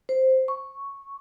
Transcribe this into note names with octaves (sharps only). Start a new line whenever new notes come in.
C5
C#6